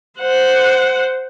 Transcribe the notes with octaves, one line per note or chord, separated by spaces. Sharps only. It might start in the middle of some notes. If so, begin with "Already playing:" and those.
C5 F#5